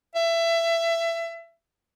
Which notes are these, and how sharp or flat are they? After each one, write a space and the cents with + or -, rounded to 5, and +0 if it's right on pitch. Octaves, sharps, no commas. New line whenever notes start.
E5 +25